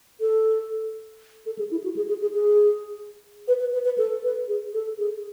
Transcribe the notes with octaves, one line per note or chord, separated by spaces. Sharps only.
A4
A4
G#4
E4
F#4
G#4
G#4
G#4
G#4
B4
B4
B4
B4
A4
B4
G#4
A4
G#4